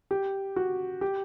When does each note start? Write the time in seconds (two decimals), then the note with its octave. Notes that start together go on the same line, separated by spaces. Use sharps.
0.11 G4
0.56 F#4
1.01 G4